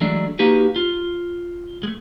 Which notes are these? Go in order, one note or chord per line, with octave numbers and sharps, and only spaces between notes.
E3 F#3 G#3 A3 D4
A#3 D#4 F#4 G4 B4
F4
G#3 A3